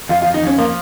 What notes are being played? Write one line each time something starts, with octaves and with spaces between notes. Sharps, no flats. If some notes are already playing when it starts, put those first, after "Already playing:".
F2 F4
F4
F2
D#4
F2 C#4
F3 A#3